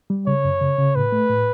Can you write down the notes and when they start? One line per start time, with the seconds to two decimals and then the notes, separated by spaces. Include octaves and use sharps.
0.10 G3
0.27 C#3 C#5
0.44 F#2
0.61 C#3
0.78 C#3
0.96 A2 B4
1.12 A3
1.30 A2